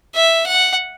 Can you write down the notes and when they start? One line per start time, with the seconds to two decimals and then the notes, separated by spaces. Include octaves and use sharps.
0.15 E5
0.46 F#5